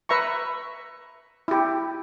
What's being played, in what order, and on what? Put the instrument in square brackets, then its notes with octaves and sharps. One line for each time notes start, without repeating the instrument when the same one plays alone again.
[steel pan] B4 E5 A#5 C#6
E4 G4